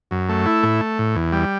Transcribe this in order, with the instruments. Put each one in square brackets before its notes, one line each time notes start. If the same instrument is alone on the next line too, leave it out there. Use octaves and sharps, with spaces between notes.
[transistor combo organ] F#2
A3
E4
A2
A3
A2
E2
G3